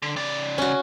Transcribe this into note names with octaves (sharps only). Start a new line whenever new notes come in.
D3
C#3 D5
C#4 F#4